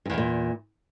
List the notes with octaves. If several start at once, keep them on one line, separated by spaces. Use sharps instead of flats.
E2 G2 A#2 C#3